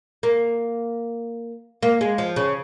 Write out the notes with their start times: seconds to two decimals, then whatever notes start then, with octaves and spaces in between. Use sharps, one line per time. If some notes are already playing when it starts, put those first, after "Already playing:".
0.23 A#3
1.83 A#3
2.01 G#3
2.18 F3
2.36 C#3